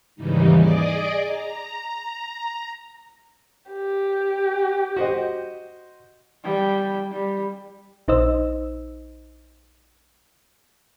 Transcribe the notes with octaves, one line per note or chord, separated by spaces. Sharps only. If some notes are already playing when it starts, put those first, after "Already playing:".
D#2 G#2 C#3 E3 G3 D#4
G#4 D5 D#5 D6
A#5
G4
F#4 C5 D#5
G3 G5
G3
A#1 D#4 C5 D#5 E6